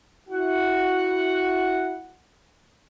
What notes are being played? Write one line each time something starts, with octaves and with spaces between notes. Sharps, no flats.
E4 F#4 F#5